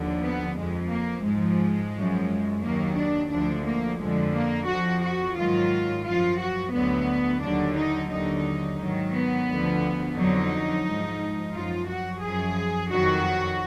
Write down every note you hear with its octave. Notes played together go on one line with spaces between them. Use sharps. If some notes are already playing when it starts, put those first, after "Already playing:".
Already playing: D#2 D3 F3
B3
F2 F3 G#3
A#3
G#2 F3 G#3
F#2 F3
D#2 D#3 F#3 A#3
D4
D2 D3 F3 D4
A#3
F2 D3 F3 G#3
A#3
F2 F3 F#4
F#4
G#2 D#3 F#3 F4
F#2 F3 F4
F#4
D2 D3 F#3 B3
D#2 D3 F#3 D4
D#4
D#2 D3 F#3 D#4
G#2 D#3 F#3
B3
D2 D3 F3
F2 D3 F#3 D#4
G#2 F3
F#2 F3 F4
F#4
F#2 F3 G#4
F2 D#3 F#3 F#4